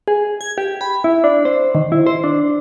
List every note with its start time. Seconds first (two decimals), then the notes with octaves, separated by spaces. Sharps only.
0.08 G#4
0.41 G#6
0.58 G4
0.81 B5
1.04 E4
1.24 D4
1.45 C5
1.75 D#3
1.92 E4
2.06 C5
2.24 D4